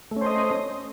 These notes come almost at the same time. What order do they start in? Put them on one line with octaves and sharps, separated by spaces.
A3 C#4 C5 D#5